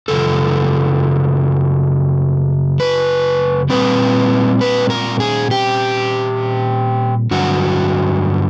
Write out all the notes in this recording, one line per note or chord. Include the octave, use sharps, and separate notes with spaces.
F#2 C#3 F3 A4
B4
A#2 G3 C4 B4
B4
A#4
G#4
G4
G2 D3 F#3 F#4